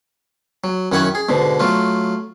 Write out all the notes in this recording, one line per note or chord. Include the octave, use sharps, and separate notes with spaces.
F#3
F#2 D#3 E4 F#5 G#5 C#6
G#4
G#2 B2 D3
F#3 A3 F4